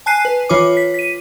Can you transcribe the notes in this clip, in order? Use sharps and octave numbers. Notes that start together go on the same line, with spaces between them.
G#5 A5 F#6 C7 D#7
B4
E3 F4 C#5 D6
B6
B6 D#7